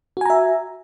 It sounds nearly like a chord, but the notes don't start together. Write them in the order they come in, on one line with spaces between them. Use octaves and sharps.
F#4 G#5 A#5 E5